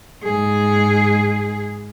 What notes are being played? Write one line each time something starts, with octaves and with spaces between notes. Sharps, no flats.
G#2 G#4